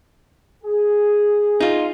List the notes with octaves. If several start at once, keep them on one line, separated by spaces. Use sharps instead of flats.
G#4
D#4 F4